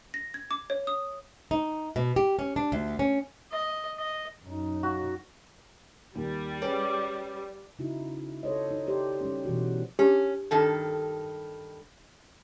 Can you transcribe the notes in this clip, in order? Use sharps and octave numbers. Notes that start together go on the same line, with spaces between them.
A#6
G#6
D6
C#5
D#6
D#4
B2
G4
C#4
D4
D2
C#4
D#5
D#5
F#2 D#4
F#4
D#2 G3
C#4 G#4 B4 D5
C#3 D#4 E4 F#4
A4 C5 C#5 D#5
D#4
G4 C5 D5
G3 C#4
B2 E3 C#4 F#4
C#4 G4
G2 D#3 A4